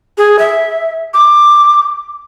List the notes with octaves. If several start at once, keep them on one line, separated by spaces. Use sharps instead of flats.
G#4
E5
D6